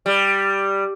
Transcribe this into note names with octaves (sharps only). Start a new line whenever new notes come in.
G3